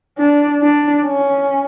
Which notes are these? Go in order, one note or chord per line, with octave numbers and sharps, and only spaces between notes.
D4
D4
C#4